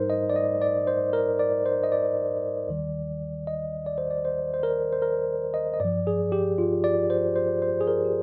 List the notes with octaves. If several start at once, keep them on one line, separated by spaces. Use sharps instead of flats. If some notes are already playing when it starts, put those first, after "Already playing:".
Already playing: G#2 G3 D#4 A#4 C5
D#5
D5
D#5
D5
C5
A#4
D5
C5
D#5
D5
D#2 D#3 G3
D#5
D5
C5
D5
C5
C5
A#4
C5
A#4
D#5
D#5
G2 F3 D5
G#4
G4
F4
D5
C5
C5
C5
G#4
A#4
G4